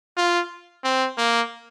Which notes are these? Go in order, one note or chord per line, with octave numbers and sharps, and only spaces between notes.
F4
C4
A#3